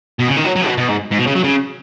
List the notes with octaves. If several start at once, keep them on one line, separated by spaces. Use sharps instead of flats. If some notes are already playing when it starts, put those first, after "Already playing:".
B2
C#3
D#3
F#3
F#3
B2
B2
G#2
G#2
B2
C#3
F#3
C#3